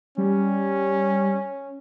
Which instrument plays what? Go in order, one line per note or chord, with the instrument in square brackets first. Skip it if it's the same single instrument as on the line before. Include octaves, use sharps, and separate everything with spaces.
[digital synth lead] G3 [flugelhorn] C#4